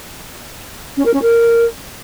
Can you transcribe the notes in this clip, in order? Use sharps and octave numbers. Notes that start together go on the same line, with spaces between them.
C#4
A#4
C#4
A#4